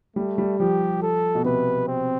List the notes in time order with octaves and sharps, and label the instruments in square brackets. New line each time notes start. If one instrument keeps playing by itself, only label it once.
[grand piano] G3 [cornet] A3
[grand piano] G3
[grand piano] F3 [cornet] G4
[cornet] A4
[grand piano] B2
[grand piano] C3 [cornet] B4
[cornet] C4